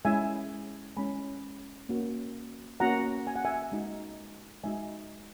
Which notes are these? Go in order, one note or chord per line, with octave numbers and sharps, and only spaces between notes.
G#3 C#4 E4 E5 G#5
G#3 C#4 E4 G#5 B5
A#3 C#4 F#4
A#3 C#4 F#4 F#5 A#5
G#5
F#5
E5 G#5
G#3 D#4 F#4
G#3 D#4 F#4 E5 G#5